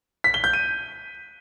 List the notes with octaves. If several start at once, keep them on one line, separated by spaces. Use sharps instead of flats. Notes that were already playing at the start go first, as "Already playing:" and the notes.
B6
G7
G6
D#7